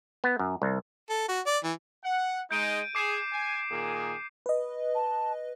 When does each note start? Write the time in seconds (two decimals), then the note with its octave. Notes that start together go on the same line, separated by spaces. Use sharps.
0.24 B3
0.39 F#2
0.62 C2
1.10 A4
1.28 F#4
1.46 D5
1.64 E3
2.03 F#5
2.51 G#3 D#4 G6 D7 D#7
2.95 G#4 D6 C7 E7
3.32 G#5
3.71 A#2 D#3 G#4
4.46 B4 D#5
4.95 A5